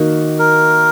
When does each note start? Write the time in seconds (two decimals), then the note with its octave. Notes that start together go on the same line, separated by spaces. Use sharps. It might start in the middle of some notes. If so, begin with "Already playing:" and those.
Already playing: D#3 A#3 D#4 F#4
0.39 A#4